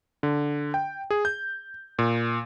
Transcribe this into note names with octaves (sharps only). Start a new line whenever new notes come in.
D3
G5
G#4
G6
A#2